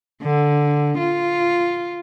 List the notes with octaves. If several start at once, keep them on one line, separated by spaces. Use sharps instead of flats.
D3
F4